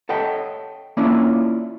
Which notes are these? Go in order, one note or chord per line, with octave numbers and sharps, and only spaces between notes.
A4 C#5 D#5 F#5 G5
A#3 C#4 D4 E4 F4 C#5